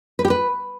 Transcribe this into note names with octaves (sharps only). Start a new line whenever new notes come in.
B4
G4
B4